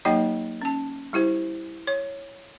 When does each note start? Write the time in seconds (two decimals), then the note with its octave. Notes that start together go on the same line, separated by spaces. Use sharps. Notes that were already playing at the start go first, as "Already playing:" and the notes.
0.05 F#3 A#3 D#4 G4 D#5 G5
0.62 C#4 A5
1.13 G3 E4 G4 C5
1.87 C#5